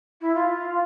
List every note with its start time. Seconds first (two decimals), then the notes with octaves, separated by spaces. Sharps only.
0.21 E4
0.34 F4